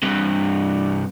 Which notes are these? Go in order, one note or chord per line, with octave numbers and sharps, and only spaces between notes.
G2 C3